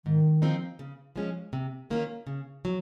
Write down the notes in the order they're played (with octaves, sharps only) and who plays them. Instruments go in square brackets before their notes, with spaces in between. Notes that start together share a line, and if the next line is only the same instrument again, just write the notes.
[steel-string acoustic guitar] G#2 [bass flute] D#3
[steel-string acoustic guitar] F3 C4 D#4
C#3
F3 G#3 C#4
C3
D#3 A#3 C#4 F4
C#3
F#3